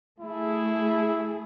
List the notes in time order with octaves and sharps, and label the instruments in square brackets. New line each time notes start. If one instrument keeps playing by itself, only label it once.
[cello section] A3 G#4 [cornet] E4